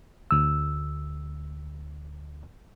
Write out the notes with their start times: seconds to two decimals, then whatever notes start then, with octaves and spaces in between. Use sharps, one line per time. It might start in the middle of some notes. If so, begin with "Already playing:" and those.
0.31 D2 E6